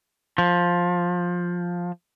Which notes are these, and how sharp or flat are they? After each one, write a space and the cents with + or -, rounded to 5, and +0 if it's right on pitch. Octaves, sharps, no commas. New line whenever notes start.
F3 +10